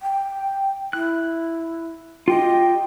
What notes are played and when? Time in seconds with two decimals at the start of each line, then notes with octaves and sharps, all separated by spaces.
0.02 G5
0.93 E4 F#6
2.28 F4 G4 D#5 G5